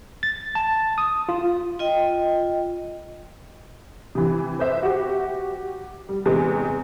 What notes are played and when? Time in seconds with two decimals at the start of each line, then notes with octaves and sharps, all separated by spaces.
0.23 A6
0.55 A5
0.98 D#6
1.29 F4
1.79 F4 D#5 G5
4.15 C3 E3
4.59 B4 C5 E5
4.83 F#4 G4
6.09 G3
6.26 E2 C3 G#3